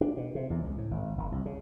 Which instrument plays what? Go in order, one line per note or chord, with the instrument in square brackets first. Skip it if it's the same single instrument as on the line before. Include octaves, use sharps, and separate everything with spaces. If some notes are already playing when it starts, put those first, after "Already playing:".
[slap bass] D4
B2
C3
E2
C#2
A2
G#1
F#1
C2
C#3